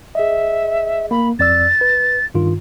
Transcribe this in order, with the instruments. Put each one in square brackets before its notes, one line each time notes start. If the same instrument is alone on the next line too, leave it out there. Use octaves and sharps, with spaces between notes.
[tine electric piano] G#4 D#5 [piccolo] E5
[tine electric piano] A#3 [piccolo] B5
[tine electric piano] F2 D5 E6 [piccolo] A6
[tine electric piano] B4
G2 D#3 F4